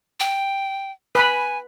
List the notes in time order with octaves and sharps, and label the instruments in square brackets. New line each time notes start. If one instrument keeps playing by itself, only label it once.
[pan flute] G5
[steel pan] B4 B5 [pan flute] G#5